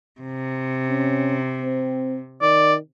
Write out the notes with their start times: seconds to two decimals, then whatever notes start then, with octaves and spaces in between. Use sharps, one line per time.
0.21 C3
0.88 C#4
1.63 C4
2.42 D#3 D5